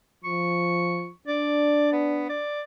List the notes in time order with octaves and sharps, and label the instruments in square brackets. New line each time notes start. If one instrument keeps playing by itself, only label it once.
[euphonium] F3 [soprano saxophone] C#6
[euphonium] D4 [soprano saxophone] D5
[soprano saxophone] B3
D5